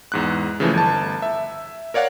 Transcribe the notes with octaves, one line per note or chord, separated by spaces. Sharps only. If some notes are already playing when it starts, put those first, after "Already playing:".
E2 G#2 F#6
C#3 E3 F3 A3
G1 A5
E5
A#4 C#5 D5 F5 F#5